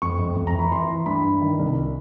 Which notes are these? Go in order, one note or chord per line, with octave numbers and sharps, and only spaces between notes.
F2 C#6
F2
F2
A#5
E3 B5
E3 C6
E3
G2 B5
G2
D#3
C2